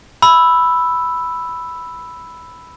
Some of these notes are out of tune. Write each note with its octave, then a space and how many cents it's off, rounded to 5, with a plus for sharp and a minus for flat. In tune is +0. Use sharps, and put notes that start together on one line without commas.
B5 +0 E6 +0